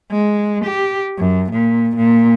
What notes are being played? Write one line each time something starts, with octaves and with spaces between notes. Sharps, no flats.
G#3
G4
F#2
A#2
A#2